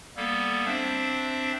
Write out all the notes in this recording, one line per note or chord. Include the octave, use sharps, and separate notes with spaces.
G3 A#3 B3 A4
C4 D4 C5 E5